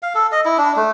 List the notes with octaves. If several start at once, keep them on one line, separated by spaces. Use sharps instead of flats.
F5
A4
D#5
E4
D4
A3